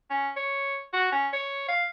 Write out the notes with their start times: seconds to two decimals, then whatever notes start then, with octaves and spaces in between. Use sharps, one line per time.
0.10 C#4
0.36 C#5
0.93 F#4
1.12 C#4
1.33 C#5
1.69 F5